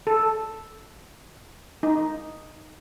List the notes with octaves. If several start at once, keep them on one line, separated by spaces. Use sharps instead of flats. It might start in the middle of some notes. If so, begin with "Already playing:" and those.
A4
D#4